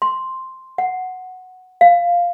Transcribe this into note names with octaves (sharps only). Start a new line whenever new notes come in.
C6
F#5
F5